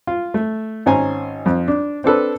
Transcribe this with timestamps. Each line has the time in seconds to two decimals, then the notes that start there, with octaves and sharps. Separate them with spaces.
0.07 F4
0.34 A3
0.86 G#1 C#4 C5 G#5 A#5
1.46 F2
1.68 D4
2.04 C4 D4 A4 B4